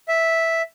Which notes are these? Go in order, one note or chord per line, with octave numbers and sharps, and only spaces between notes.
E5